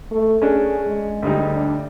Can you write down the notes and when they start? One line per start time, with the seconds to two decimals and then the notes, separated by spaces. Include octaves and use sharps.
0.11 A3
0.42 C#4 D4 G#4
0.86 G#3
1.22 D2 G3 D#4
1.53 D4